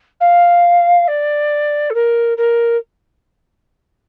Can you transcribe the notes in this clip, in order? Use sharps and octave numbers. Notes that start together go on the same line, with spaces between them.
F5
D5
A4
A#4
A#4